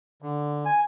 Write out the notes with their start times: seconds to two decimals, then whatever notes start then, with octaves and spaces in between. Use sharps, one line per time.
0.22 D3
0.65 G#5